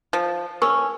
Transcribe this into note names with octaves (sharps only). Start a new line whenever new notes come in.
F3
C#4 A#4 C#6